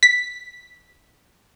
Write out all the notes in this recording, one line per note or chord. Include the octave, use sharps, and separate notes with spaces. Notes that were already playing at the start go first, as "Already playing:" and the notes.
B6